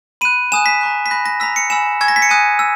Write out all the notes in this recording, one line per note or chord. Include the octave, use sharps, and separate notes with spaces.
B5 F#6 D#7
G#5 D#6 F#6 E7
B6
A#5 C#6 F#6
B6
B5 F#6 A#6
A#6
A#5 E6 B6
C#7
G#5 B5 E6 E7
G#5 C#6 E6 G#6
A#6
B6
C#7
G#5 D#6 F#6 D#7
E6